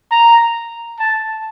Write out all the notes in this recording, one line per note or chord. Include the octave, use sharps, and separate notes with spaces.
A#5
A5